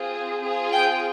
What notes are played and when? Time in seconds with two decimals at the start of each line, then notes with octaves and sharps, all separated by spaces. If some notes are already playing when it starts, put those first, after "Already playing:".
Already playing: C4 F4 G#4
0.42 C4 F4 G#4
0.71 G5